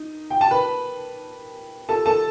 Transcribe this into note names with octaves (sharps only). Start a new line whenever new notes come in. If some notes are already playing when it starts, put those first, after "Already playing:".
Already playing: D#4
G5
A5
B4 B5
A4 A5
A4 A5